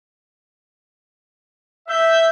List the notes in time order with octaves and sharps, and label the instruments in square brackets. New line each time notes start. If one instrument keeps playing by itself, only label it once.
[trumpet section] E5 [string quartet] G6